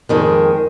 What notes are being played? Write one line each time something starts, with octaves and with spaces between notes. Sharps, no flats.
F2 D#3 G#3